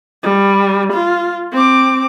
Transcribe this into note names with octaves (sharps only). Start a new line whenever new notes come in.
G3
F4
C4 D6